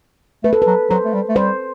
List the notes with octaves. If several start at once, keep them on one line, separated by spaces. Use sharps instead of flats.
A3 B4
A4
B4
F#3
F#3 C5
A3
G3
A3
G3 C5